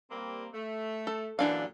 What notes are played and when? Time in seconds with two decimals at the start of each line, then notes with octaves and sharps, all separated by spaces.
0.11 G3 A#3 C4
0.54 A3
1.07 A4
1.39 F#2 A#2 D3 E3 D4 F5